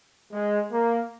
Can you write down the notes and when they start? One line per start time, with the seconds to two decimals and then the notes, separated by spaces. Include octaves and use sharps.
0.33 G#3
0.72 A#3